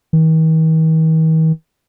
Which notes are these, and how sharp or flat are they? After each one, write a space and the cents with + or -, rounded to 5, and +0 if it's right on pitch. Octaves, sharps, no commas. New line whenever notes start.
D#3 +45